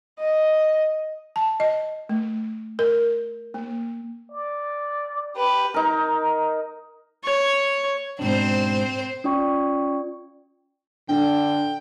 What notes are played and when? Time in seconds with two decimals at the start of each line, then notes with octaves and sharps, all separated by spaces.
0.20 D#5
1.36 A5
1.60 D#5
2.09 A3
2.79 A#4
3.54 A#3
4.31 D5
5.36 G4 B4
5.74 D#4 A#4
7.24 C#5
8.19 G#2 B2 C4 D4 C5
9.24 C#4 F4 D5 G5 C#6
11.09 D3 D4 G5